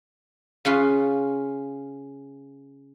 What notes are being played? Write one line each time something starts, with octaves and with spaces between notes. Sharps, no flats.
C#3 C#4 F4 B4